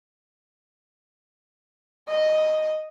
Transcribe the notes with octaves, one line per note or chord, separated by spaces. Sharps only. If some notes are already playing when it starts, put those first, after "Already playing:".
D#5